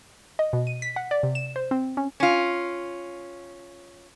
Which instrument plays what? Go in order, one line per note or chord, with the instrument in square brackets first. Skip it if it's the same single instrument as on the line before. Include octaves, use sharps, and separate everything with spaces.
[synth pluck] D#5
B2
D#7
B6
F#5
D5
C3
E7
C5
C4
C#4
[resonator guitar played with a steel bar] C#4 F4